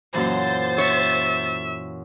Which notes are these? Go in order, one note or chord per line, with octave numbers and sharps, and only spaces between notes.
F#2 A#2 E3 C5 A6
C#5 E5